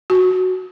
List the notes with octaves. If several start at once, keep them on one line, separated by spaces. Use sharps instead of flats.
F#4